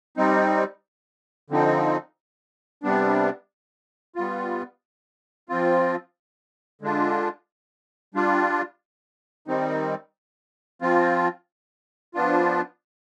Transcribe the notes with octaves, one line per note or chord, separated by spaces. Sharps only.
G3 C4 D#4
D3 F3 C4 D#4
C3 G3 B3 D4
G3 B3 F4
F3 C4 F4
D3 G#3 D4 F4
G3 D4 F4
D#3 G3 C4 D#4
F3 C4 F4
F3 B3 D4 F4